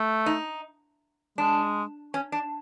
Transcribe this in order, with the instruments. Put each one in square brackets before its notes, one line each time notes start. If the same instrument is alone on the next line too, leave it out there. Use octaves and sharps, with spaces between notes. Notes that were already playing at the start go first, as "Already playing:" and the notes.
Already playing: [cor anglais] A3
[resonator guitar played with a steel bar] D#4
[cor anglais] G#3 [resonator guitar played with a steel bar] D4
[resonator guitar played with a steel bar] C#4
D4